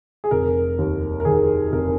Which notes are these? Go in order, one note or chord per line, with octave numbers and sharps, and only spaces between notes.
G#4
F1 A#4
D#2
A#4
D#3 G#4
F1 A#4